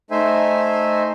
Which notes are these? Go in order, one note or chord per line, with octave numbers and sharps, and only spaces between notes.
A3 D#4 C5 E5 G#5